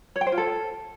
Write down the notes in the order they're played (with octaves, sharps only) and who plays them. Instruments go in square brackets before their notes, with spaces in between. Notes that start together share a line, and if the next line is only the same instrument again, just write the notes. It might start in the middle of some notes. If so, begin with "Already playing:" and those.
[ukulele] C#5
G5
C5
F4
A4